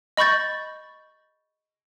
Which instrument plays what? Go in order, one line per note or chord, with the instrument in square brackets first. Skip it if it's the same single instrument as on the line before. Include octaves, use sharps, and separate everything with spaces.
[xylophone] D#5 B5 C#6 G6 A6